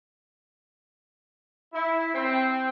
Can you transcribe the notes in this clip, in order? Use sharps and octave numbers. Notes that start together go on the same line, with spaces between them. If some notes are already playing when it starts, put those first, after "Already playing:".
E4
C4